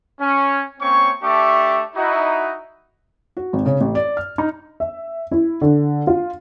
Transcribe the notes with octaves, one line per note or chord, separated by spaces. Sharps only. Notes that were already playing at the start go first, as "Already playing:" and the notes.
C#4
A#3 C4 C#4 C#5 C#6
A3 D4 G4 E5 C#6 D6
D#4 E4 F#4
F#4
G#1
C#3
A1
D5
F6
D#4
E5
E4
D3
F4